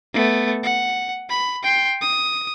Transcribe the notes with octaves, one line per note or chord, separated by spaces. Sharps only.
A3 B3
F#5
B5
G5 C6
D#6